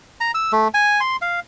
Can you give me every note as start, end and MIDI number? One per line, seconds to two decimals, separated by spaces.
0.20 0.31 82
0.35 0.52 88
0.52 0.68 57
0.74 1.00 80
1.00 1.16 84
1.21 1.40 77